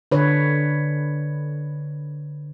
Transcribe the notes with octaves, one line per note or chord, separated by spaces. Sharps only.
D3 B4 C#5